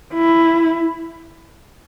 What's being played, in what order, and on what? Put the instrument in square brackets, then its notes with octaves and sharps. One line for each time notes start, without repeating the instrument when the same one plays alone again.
[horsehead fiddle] E4